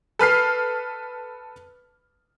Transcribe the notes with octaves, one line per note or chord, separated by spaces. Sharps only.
A4 B4 F6 C7